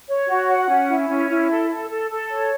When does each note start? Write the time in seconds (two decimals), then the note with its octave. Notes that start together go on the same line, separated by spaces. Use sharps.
0.08 C#5
0.28 F#4
0.48 F#5
0.69 C#4
0.88 E4
1.09 C#4
1.29 E4
1.49 A4
1.70 A4
1.90 A4
2.09 A4
2.30 C#5